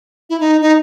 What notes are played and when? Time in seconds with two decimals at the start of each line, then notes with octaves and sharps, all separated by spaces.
0.30 E4
0.40 D#4
0.61 D#4